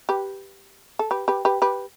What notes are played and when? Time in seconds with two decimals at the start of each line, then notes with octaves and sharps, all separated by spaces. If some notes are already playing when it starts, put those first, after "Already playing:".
0.09 G4 B4
0.99 A4
1.11 G4 B4
1.28 G4 B4
1.45 G4 B4
1.62 G4 B4